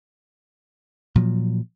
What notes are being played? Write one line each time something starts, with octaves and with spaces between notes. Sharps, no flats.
A#2 F3 F#3